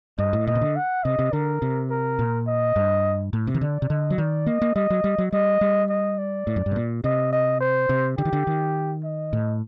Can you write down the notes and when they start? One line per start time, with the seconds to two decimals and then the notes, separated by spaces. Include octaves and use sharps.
0.18 G2 D#5
0.33 A2
0.47 A#2 D#5
0.55 C3
0.61 D3
0.76 F#5
1.04 C3 D#5
1.19 C3
1.33 D3 A#4
1.62 C3
1.90 A#4
2.19 A#2
2.47 D#5
2.76 G2
3.33 A2
3.47 C3
3.54 D#3
3.61 D3 D5
3.82 C3
3.90 D3 D#5
4.10 F#3
4.18 D#3 D5
4.46 A#3 D#5
4.62 A#3
4.76 G3 D#5
4.90 F#3
5.04 G3
5.18 F#3
5.32 G3 D#5
5.61 G3
5.90 D#5
6.18 D5
6.47 A2
6.56 F#2
6.66 G2
6.72 C3
6.76 A#2
7.04 C3 D#5
7.32 D#5
7.61 C5
7.89 C3
8.18 D3 G4
8.25 D#3
8.33 D3
8.47 D#3
9.04 D#5
9.33 A2